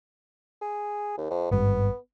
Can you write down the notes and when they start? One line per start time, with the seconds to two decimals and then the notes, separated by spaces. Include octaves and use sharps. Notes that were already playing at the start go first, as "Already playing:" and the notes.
0.61 G#4
1.17 D#2
1.30 F2
1.51 G#1 G2 B3